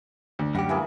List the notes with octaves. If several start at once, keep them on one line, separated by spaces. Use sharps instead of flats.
D2
F#2 G3 G4 F#5
E3 A#3 G#4